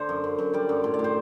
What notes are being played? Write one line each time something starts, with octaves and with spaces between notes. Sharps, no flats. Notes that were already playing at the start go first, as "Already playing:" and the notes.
Already playing: D3 C5 D5
F#2
F#2
F#2
G3 D5
F#2
A2
D5
A2
C5